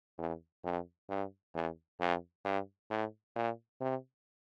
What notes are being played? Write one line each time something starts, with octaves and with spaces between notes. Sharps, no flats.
E2
F2
G2
E2
F2
G2
A2
A#2
C3